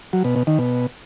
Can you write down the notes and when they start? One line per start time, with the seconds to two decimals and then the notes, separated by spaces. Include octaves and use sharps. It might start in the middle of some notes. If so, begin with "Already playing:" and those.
0.13 F#3
0.24 B2
0.36 B2
0.47 D#3
0.59 B2